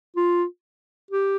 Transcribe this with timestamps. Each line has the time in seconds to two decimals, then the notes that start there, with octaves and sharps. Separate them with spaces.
0.16 F4
1.11 G4